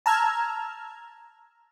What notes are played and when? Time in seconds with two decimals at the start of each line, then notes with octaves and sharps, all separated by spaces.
0.06 A5 A#5 E6 F6 G#6